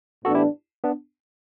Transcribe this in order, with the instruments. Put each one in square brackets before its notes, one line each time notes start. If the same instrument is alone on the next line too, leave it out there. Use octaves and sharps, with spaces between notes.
[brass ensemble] A2 E3 B3 D4 [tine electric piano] F#4 A4
[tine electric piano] E4 G4
B3 D4